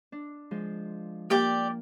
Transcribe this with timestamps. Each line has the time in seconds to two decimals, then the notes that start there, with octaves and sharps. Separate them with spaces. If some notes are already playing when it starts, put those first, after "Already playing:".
0.12 D4
0.51 F3 G#3
1.30 A#3 G4 D5 G5